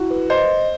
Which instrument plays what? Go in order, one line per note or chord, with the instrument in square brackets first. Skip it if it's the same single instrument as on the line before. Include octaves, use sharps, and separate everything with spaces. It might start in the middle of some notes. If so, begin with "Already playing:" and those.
Already playing: [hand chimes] E4 [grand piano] F#4
[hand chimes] B4
[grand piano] C5 [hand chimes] D#5